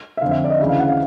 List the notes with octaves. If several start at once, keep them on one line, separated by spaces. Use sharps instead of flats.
E5
F2 D3 F5
E5
D5
D#5
D2 C#3 E3 E5
F5
F#5
F5